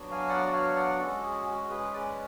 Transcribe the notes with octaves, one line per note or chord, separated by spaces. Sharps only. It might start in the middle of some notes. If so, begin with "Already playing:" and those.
Already playing: F#3 B3 D4 F#4
F5 G#5
D5 F#5
D5
C#5 F5
D5 F#5
G#3 C#4 F#4 A4
G#4
F#4
G#4 B4
B4 D5